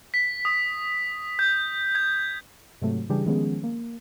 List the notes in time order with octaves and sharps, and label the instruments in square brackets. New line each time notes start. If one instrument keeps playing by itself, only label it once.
[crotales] B6
D#6
G6
G#6
[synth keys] G#2 C3 F#3 A3
C#3 E3 G3 D4 G4 G#4
D#3 F3 G#3 B3 C#4 G#4
A#3